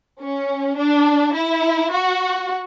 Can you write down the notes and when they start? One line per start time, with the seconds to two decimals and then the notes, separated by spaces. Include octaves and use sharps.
0.21 C#4
0.78 D4
1.35 E4
1.92 F#4